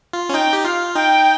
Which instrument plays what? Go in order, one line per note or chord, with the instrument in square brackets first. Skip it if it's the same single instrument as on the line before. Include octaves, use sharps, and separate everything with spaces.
[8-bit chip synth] F4
C#4
[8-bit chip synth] D#4 [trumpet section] G5
[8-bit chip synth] G4
[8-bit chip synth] F4 [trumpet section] F5
[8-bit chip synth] D#4 [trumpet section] G5